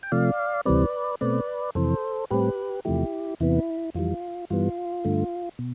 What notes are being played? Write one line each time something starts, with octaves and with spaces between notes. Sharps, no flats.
G5
C3 F3 A3 D5 F5
D2 C3 E3 G3 C4 B4 D5
B2 A3 C4 B4 D5
F2 C3 E3 A4 C5
A2 G3 C4 G4 B4
E2 C3 F3 A3 E4 G4
E2 C3 E3 B3 E4
F2 E3 G3 F4
G2 E3 G3 B3 F4
G2 D3 A3
B2